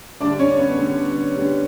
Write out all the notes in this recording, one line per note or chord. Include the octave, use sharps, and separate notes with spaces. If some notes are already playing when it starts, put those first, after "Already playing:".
D3 G3 D4 D5
C#4 C#5
B3 B4
D3 G3
D3 G3